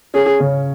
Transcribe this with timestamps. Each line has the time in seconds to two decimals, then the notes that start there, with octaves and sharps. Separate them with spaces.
0.14 C#4 G#4
0.40 C#3